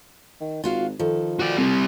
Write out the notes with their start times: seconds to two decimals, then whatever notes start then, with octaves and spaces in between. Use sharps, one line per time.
0.41 D#3
0.64 G#1 F4 F#4 F5
0.99 D#3 F3 A4
1.40 F#4 D5
1.57 G3 C4